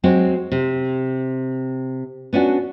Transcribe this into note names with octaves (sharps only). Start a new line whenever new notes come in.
F#3 G#3 C4 F#4
C3
B3 C#4 D4 F4 F#4